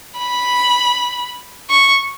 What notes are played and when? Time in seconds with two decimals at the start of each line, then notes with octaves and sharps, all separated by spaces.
0.18 B5
1.70 C#6